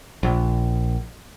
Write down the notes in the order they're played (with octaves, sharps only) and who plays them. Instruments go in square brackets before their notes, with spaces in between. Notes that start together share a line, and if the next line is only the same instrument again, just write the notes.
[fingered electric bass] A#1